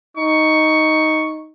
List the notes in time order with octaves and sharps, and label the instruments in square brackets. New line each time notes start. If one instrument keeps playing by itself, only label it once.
[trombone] D#4 [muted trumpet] C#6